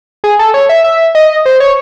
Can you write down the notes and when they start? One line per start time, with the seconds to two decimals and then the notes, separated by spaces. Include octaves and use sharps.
0.24 G#4
0.39 A4
0.54 C#5
0.69 E5
0.84 E5
1.15 D#5
1.46 C5
1.60 C#5